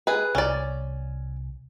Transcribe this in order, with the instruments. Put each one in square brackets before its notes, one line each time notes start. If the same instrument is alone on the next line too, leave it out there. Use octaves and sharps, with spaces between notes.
[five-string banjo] G#4 B4
[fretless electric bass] C2 [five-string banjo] C#4 D5